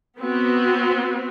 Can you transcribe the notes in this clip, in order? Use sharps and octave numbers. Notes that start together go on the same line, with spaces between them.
B3 C4 F#4